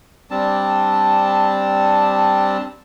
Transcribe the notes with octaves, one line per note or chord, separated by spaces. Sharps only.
G3 C4 D4 A5